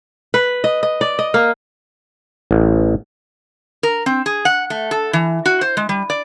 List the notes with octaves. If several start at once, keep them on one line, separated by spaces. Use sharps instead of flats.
B4
D#5
D#5
D5
D#5
A#3
A1
A#4
C4
G#4
F#5
A3
A4
E3
F#4
C5
G#3
G3
D5